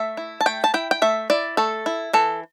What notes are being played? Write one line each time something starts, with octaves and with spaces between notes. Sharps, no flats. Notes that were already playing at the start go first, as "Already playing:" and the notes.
Already playing: A3 E5
E4
A5
A3 G5
A5
E4 G5
G5
A3 E5
E4 D5
A3 A4
E4
E3 A4